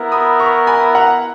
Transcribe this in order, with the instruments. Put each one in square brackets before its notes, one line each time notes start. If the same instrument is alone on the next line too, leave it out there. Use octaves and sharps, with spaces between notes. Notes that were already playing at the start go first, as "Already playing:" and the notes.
Already playing: [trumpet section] B3 E4 A#4
[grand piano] B5 D#6
A#5 C#6
G#5 B5
F#5 A#5